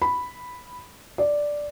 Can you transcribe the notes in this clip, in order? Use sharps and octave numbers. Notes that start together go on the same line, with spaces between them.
B5
D5